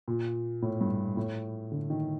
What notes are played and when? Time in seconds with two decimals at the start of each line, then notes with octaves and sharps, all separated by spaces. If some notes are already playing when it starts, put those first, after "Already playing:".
0.08 A#2
0.62 A2
0.81 G2
1.17 A2
1.72 D3
1.90 D#3